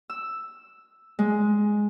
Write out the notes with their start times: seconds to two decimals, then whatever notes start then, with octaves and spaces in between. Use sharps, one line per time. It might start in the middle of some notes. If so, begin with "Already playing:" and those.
0.10 E6
1.19 G#3